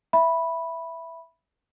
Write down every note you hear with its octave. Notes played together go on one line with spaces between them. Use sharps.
E5 B5